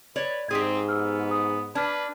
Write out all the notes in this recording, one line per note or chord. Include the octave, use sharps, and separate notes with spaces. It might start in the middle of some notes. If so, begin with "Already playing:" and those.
B4 C#5 D5
G#2 C4 G4 G#4 D#6
B3 E6 F6
D#6
D4 B4 D6 F6 G#6